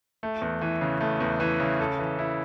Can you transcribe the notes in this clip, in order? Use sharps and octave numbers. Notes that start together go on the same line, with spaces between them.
A3
E2
E3
C#3
A3
E2
E3
C#3
A4
E3
E4